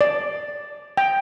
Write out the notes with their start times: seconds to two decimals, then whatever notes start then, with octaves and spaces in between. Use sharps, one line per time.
0.01 D5
0.97 G5